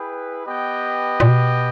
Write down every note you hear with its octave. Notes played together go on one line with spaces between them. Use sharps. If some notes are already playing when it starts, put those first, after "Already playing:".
Already playing: E4 G#4 B4 G5
B3 G4 B4 D#5 G5
A#2
B2